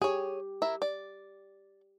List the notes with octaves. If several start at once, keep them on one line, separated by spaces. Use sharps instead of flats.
G4 G#4 C#5
E4 A#4 E5
D5